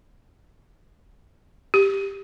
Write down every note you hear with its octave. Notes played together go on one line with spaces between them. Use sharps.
G4